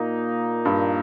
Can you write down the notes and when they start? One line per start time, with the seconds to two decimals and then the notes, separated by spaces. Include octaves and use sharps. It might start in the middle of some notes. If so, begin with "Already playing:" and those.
Already playing: A#2 A#3 D#4
0.65 G2